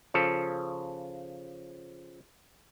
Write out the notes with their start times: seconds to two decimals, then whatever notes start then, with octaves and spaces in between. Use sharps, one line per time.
0.14 C#3 F3 A4